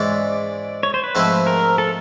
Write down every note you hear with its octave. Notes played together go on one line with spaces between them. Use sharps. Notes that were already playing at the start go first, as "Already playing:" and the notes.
Already playing: G#2 E3 G#3 C#4 D5
C#5
C5
B4
G#2 F3 A3 C4 E4
A#4
A4